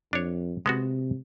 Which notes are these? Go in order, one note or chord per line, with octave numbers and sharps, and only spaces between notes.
F2 D4 C#5
C3 G#3 B3 F#4